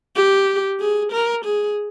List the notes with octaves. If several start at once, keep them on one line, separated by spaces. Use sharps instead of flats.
G4
G#4
A#4
G#4